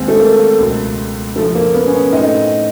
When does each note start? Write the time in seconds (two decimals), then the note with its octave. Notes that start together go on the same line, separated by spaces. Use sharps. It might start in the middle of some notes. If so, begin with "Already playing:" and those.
Already playing: D#2 D#3 G#3 C4
0.08 A3
0.20 A#3
0.58 C#2 B2 F#3
1.36 F#2 C#3 F3 A3
1.55 A#3
1.74 B3
1.87 C#4
2.13 A2 F#3 A3 C4 D#4